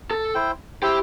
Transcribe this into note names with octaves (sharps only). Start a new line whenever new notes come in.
A4
E4 C5 G5
E4 G4 C5 G5